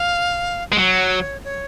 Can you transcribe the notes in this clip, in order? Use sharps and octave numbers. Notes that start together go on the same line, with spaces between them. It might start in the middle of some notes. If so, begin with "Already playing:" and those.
Already playing: F5
G#3
F#3 C#5
C#5